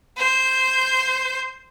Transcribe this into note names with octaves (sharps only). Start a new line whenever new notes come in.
C5 G6